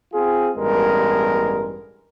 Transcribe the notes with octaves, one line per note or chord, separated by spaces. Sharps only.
C4 F4 G#4
A1 G2 G#3 B3 A#4